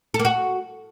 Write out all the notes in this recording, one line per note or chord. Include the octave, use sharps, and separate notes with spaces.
A4
A#3
F#4